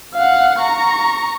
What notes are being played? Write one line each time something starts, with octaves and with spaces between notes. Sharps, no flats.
F5 F#5
A#5 C#6